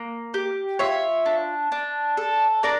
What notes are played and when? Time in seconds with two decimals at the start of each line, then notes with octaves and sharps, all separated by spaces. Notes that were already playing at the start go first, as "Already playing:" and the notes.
Already playing: A#3
0.34 G4
0.79 F4 C#5 E5
1.26 D4
1.72 D4
2.17 A4
2.63 D4 A#4 D5